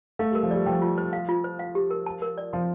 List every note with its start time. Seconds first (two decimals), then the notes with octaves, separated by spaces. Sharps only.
0.19 A3 F5
0.31 G3 A#4
0.43 F3
0.51 G3 D5
0.66 F3 G5
0.82 F4
0.98 C5
1.13 F5
1.29 F4
1.44 C5
1.59 F5
1.75 G4
1.91 A#4
2.06 A5
2.22 A#4
2.38 D5
2.53 F3 C6